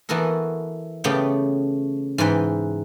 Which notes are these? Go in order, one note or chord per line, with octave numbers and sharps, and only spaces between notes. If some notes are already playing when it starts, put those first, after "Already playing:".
E3 B3 F#4 A4 A#4
C#3 A3 B3 G4 G5
G#2 E3 B4 G5